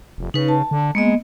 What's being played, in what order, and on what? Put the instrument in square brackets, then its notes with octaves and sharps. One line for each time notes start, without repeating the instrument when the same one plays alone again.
[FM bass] F1
[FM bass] C#3 [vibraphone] D#4 B4
[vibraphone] A5
[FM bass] D3
[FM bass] G#3 [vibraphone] A#3 B3 D#5